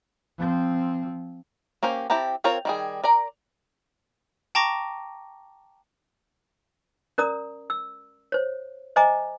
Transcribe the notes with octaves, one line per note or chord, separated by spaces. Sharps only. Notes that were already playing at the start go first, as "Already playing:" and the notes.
F3 C4
A#3 C#4 G4 C5
C4 E4 G4 A5 A#5
C4 F4 A#4 C#5
D#3 G3 G#4
A#4 D5 A#5
G5 A5 A#5 C#6 D6 A#6
C#4 A#4 D5 A#5 D#6
E6
C5 C#5
C5 D#5 E5 G#5 A#5 D6